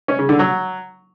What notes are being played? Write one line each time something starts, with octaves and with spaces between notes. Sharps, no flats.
C#4
C#3
D3
F#3